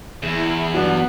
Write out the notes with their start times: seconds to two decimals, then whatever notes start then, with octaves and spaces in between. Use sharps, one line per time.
0.23 E2 E4 G#4
0.74 G2 F#3 B3 D4